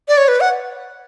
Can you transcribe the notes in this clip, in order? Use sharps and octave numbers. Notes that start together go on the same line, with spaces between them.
D5
C#5
B4
F#5